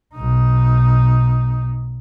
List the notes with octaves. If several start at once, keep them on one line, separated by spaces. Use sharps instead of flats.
B1 D#4